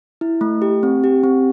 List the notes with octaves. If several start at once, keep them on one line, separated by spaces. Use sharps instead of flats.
E4
A3
G4
C4
G4
C4